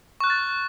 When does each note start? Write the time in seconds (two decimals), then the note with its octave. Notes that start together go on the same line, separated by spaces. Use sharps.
0.20 C#6
0.24 F#6
0.27 F6
0.30 A6